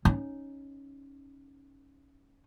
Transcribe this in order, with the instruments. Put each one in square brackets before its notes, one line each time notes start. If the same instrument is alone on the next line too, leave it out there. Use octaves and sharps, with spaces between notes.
[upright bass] C#4 D#4